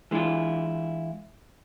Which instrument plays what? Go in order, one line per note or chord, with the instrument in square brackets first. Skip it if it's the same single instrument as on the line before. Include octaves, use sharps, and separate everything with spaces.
[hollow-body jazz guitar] E3 G#3 D4 E4 F4